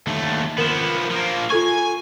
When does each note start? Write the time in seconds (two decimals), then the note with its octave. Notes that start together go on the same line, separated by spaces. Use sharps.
0.07 D#2 A3
0.58 F3 B3 A#4 E7
1.11 F3 A#3
1.50 F4 A4 G#5 C#6